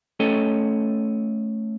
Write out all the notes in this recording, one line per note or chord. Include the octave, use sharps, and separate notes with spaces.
A3 C#4 A4 C#5 D#5 G5